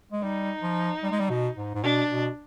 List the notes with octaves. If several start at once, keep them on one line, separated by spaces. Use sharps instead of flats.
G#3
G3 D#4
F3
G3
G#3
G3
B2
G#2
G#2
B2 D4
B2